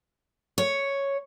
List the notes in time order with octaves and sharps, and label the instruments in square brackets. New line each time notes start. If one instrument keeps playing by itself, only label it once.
[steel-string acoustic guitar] C#5